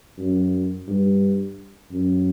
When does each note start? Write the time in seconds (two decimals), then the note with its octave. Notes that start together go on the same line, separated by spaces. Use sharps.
0.18 F#2
0.88 G2
1.91 F#2